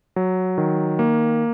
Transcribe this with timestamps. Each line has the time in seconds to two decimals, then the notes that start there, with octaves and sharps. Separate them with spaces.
0.16 F#3
0.58 D#3
0.99 A#3